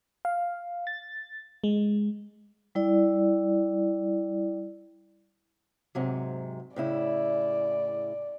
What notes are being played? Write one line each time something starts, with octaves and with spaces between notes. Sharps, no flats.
F5
A6
G#3
G3 E4 D5
G#2 C3 F#3
A2 C#3 E4 D5